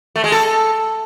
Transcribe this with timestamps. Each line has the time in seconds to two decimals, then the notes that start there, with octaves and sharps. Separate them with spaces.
0.16 A3
0.24 G#3
0.32 A4